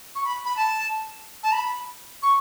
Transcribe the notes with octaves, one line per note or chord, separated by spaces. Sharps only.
C#6
B5
B5
A5
A5
B5
C#6